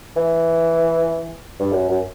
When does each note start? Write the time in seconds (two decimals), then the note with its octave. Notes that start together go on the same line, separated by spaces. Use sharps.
0.16 E3
1.60 G2
1.72 F#2
1.88 F#2